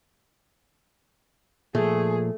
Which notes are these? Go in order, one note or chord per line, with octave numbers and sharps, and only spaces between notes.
A#2 F3 A3 G#4